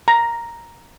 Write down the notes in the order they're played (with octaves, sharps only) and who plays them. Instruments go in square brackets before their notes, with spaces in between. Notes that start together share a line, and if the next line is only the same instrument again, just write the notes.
[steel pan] A#5